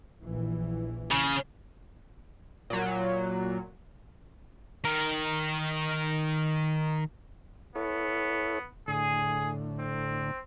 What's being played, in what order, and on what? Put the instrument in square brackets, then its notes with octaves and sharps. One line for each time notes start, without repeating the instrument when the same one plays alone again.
[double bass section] A#1 E3
[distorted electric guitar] C#3
[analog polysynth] A#2 F#3
[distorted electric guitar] D#3 A#4
[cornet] B3 [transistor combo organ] E4 A4 C#5
[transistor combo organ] A2 D3 [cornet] G#4
[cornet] C4